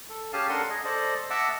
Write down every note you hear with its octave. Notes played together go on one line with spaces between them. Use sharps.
A4
C#4 G4 G#4 F5 G#5 A5
D4 A4 A#4 F#5 C6
G#4 D#5
A4 C5 D5 D#5
D#5 E5 F#5 A5 D6 E6